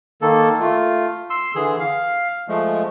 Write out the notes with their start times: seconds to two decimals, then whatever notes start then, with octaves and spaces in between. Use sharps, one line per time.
0.22 D#3 A#3 A4
0.60 A3 F4
1.30 C6 E6
1.55 D3 E3 G#4
1.80 F5
2.48 F3 G#3 A3